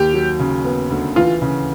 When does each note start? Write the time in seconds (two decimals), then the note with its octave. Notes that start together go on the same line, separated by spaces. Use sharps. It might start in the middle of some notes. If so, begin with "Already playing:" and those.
Already playing: D#2 G4
0.14 F#3
0.39 C#3
0.65 B3
0.91 D2
1.16 E3 F4
1.42 C#3